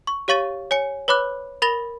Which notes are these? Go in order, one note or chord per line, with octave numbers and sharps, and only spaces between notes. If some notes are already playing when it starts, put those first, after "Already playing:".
C#6
G4 C#5 F5 C#6 A6 D#7
C#5 G#5 C#7
B4 C#5 B5 D6 F#6
A#4 B5 A6 A#6 F7 G7